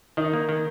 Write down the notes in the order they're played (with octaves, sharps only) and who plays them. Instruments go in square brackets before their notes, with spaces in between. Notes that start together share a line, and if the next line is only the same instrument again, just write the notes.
[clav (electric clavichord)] D#3 [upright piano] D#4
[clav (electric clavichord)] A#3
D#3